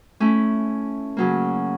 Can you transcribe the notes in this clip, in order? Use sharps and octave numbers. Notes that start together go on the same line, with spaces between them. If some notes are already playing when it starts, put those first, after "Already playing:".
A3 C#4 E4
C#3 F#3 A#3